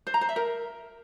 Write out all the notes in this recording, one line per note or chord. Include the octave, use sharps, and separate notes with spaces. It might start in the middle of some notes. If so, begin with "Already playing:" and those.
C5
A#5
C5
E5
A#4